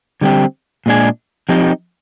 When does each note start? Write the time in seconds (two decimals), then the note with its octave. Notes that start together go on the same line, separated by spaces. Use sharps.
0.21 D3 G3 C4 G4
0.86 A#2 G#3 D4 G#4
1.49 F3 C4 D#4 G4